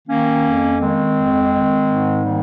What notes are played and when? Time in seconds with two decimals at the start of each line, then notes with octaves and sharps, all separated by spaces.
0.08 D#3 A#3 C#4
0.45 F2
0.80 D#3 G#3 C4
1.16 F2
1.53 D#3
1.88 G#2
2.25 D#3 G3 A#3